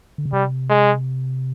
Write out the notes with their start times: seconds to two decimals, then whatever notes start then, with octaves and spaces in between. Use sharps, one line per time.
0.18 D3
0.25 C#3
0.33 C3 G3
0.70 G#3